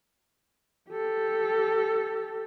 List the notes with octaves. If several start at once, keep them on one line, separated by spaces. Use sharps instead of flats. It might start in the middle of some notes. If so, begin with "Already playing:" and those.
G4 A4